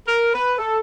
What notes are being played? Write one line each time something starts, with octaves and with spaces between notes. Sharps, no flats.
A#4
B4
A4